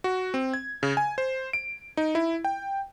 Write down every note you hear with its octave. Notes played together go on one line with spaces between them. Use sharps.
F#4
C4
G#6
C#3
G#5
C5
D7
D#4
E4
G5